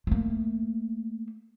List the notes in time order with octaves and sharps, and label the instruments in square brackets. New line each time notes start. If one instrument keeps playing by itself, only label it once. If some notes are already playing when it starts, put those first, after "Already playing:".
[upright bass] A3 A#3